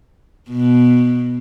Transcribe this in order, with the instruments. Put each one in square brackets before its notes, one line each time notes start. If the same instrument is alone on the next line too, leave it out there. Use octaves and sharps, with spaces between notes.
[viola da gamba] B2